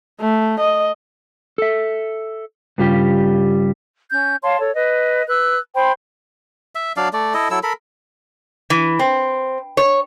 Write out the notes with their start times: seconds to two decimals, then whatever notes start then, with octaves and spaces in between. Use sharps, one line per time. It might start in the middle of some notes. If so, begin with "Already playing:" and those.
0.21 A3
0.60 D#5
1.58 A4 E5
2.78 G2 C#3 G3 F4 G4
4.11 C#4 G6
4.43 C#5 F5 A5 C6
4.60 A4 C#5
4.74 B4 D#5
5.28 B4 E6 F#6
5.76 C5 G5 B5 C6
6.75 E5
6.97 F#3 D4 D5 F5
7.13 A3 D5
7.34 E4 A4 D#5
7.51 F#3 E4 A4 E6
7.63 A4 A#4 B5
8.70 E3
8.99 C4
9.77 C#5